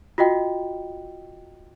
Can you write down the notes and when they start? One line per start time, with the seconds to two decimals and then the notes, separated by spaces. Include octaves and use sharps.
0.18 F4 F#4 D#5 G5